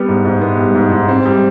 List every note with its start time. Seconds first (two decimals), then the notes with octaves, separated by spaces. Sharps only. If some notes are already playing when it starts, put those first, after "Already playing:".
Already playing: G3 B3
0.08 G#2
0.25 G#2
0.41 B3
0.58 G3
0.75 G#2
0.92 G#2
1.08 C4
1.26 G3